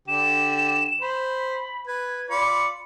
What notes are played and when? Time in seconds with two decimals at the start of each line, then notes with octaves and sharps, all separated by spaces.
0.08 D3 G4 E7
1.01 C5 B5
1.87 B4 G#6
2.30 F4 D5 B5 C#7